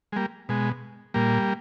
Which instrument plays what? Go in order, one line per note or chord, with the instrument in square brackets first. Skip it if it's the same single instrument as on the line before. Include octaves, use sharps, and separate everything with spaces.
[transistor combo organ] G#3
G3 A#3
B2 G#3
A#2 G3 A#3